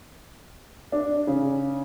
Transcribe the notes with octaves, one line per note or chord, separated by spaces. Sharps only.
D4
C#3